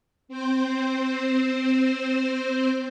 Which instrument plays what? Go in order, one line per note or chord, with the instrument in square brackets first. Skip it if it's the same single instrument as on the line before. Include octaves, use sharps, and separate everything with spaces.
[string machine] C4 C5